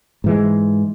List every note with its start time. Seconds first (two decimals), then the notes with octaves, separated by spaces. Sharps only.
0.24 G#2 E3 G#3